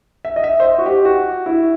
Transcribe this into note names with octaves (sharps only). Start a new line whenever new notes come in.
E5
D#5
E5
C5
D#5
F#4
G4
F#4
E4